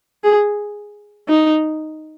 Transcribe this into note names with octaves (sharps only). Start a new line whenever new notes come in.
G#4
D#4